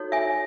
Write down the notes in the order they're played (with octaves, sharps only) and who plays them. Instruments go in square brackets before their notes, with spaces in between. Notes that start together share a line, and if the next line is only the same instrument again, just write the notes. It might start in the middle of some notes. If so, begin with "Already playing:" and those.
Already playing: [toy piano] D#4 F#4 A4 C#5
E5 G#5